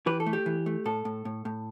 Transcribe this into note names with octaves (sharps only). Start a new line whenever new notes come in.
E3 G4 B4
A4
A3
G4
E3
A3
A2 A4
A2
A2
A2